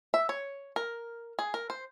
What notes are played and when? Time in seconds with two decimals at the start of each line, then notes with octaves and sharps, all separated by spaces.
0.14 E5
0.29 C#5
0.76 A#4
1.39 G#4
1.54 A#4
1.70 C5